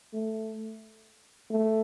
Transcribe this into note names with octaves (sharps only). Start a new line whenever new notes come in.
A3
A3